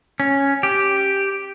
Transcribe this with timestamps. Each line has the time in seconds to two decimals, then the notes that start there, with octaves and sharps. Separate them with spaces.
0.20 C#4
0.63 G4